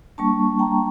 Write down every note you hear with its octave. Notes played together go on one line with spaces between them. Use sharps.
G3 A#3 D4 A5 C#6
G5 A#5